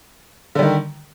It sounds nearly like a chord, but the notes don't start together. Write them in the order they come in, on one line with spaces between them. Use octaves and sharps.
D3 G3 D#3